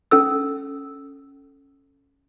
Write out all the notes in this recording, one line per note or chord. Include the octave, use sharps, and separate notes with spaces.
C#4 A4 E6